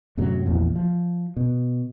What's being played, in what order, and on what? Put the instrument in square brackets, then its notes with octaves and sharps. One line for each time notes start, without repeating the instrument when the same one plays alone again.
[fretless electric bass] F#2 A2 C3 F#3
A1 E2 A#2 F3
F3
B2